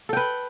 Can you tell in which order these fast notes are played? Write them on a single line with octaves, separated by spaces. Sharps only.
A4 G5 B4